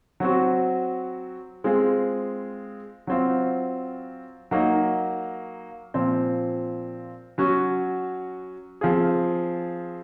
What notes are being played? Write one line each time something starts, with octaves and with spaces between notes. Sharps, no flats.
F#3 C4 F#4
G#3 C4 F4 G#4
F#3 C4 F4
F#3 A#3 D#4
A#2 F3 C4
F#3 C#4 F#4
F3 C4 F4 G#4